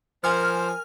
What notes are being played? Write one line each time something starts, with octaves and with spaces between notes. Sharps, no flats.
F3 A#4 C5 G#5 F6